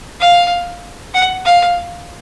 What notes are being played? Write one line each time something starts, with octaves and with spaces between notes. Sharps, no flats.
F5
F#5
F5